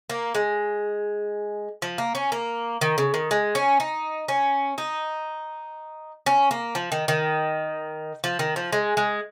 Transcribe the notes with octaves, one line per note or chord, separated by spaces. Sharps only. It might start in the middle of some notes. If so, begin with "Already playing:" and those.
A#3
G#3
F3
A#3
C#4
A#3
D#3
C#3
D#3
G#3
C#4
D#4
C#4
D#4
C#4
A#3
F3
D#3
D#3
F3
D#3
F3
G#3
G#3